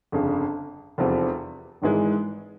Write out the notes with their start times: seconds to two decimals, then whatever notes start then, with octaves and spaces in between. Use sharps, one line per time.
0.12 G1 F2 C#3
0.98 F1 E2 C3 F3
1.82 G#1 G#2 E3 G#3